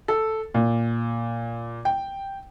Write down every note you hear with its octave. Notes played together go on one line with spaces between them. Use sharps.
A4
A#2
G5